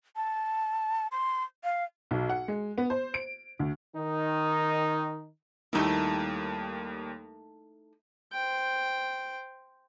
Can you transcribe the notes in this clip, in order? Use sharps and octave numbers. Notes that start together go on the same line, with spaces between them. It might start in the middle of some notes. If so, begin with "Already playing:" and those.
A5
C6
F5
B1
F#5
G#3
B3
C5
D7
D2
D#3 D#4
D#2 G3 A3 A#3 D#4 E4
C5 G5